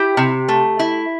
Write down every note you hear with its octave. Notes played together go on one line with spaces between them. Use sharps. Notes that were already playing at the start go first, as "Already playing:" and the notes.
Already playing: E4 G4 G5
C3
A3
E4